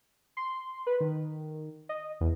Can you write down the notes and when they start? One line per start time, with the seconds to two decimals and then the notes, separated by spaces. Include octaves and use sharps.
0.37 C6
0.87 B4
1.00 D#3
1.89 D#5
2.20 E2